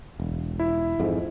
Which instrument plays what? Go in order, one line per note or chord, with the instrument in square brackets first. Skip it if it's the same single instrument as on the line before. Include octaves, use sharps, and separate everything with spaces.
[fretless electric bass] E1
[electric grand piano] E4
[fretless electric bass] F2 G#2